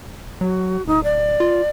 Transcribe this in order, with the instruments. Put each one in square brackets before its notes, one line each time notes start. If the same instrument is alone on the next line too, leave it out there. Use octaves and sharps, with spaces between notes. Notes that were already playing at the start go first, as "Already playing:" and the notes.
[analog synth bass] F#3 [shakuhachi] F#4
[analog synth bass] D1 [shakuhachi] D#4
[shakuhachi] D5
[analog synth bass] F4